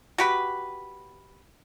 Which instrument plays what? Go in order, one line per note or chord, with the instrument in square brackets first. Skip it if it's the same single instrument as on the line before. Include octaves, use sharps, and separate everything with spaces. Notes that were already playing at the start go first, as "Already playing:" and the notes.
[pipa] F#4 G4 B4